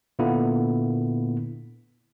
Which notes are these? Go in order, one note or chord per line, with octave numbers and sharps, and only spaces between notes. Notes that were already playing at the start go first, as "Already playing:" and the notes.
A#2 D3 A#3 B3 E4